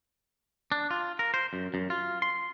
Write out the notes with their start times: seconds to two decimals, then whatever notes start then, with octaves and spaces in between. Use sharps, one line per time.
0.72 D4
0.91 F4
1.19 A#4
1.34 C5
1.53 F#2
1.74 F#2
1.90 F4
2.22 C6